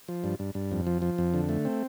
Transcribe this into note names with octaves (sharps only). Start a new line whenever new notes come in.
F3
G2
G2
G2
F2
F3
F3
F2
D3
A3
C4